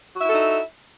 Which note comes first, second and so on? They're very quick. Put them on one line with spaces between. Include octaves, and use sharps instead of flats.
F#4 E5 E4 A4 D#4